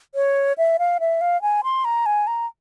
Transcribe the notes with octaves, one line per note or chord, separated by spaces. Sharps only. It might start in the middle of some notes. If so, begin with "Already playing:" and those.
C#5
E5
F5
E5
F5
G#5
C6
A#5
G#5
A#5